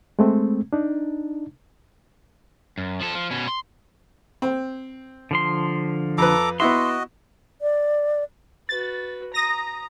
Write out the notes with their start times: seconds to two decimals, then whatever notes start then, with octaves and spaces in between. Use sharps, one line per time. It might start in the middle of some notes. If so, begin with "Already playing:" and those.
0.19 G#3 A3 C4
0.73 D4 D#4
2.78 F#2
3.01 F3 A4
3.15 F3
3.31 B2 C#4
3.48 C6
4.42 C4
5.31 D3 F3 C6
6.18 F2 A4 B4 A#5 D6
6.60 B3 E4 F#4 D#5 E5 C6
7.61 D5
8.69 F#4 B4 A6
9.34 A#5 D#6 A#6